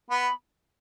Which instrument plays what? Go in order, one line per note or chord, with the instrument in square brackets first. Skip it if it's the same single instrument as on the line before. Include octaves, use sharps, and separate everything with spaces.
[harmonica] B3 [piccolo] B5